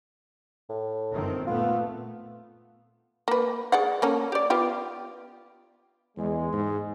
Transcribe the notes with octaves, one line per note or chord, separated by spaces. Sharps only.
A2
G1 D#3 C4
A#2 A3 B3 F4
A#3 B4
G#4 D5 F#5
A#3 C#4 A4
G4 D5
B3 F4 G4
E2 G#3
G#2